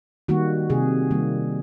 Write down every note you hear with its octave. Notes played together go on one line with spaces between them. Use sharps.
D#3 G3 A#3 F#4
C3 G#4
D#3 G3 A#3